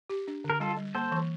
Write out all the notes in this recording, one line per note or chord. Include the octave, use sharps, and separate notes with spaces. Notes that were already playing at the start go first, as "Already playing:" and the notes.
G4
D4
D3
A#4
G3 F4 A4
G3
A#3 A4 C5
E3